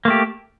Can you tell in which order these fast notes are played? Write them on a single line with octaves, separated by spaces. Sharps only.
A#3 A3 G4